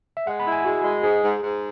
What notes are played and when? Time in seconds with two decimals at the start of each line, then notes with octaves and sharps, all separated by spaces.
0.17 E5
0.27 G#3 F#5
0.40 B5
0.46 E4
0.52 G#5
0.65 G#3 F#4
0.84 G#3
1.03 G#2 G#4
1.23 G#2
1.41 G#2